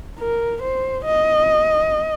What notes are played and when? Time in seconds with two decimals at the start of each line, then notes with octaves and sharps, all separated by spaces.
0.19 A#4
0.62 C5
1.05 D#5